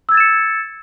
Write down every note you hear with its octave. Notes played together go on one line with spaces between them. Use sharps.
E6 G#6 A6 C#7 E7